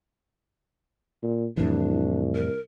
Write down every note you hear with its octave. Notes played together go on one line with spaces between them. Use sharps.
A#2
C2 F2 A2 E3 D4
A#4